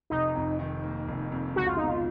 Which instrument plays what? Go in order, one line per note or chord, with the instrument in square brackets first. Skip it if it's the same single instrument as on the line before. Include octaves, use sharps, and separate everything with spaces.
[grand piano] F1 [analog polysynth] D#4
[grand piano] F2
D#3
A#3
F1
F2
[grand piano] C#2 [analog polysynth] F#4
[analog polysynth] F4
[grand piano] B2 [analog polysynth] D#4
[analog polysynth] F4